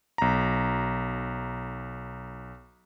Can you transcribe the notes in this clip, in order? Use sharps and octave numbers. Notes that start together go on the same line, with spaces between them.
B1 A#5